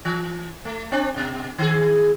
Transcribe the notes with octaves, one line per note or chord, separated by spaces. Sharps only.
E3
A3
C4 D4
B2
D#3 G#4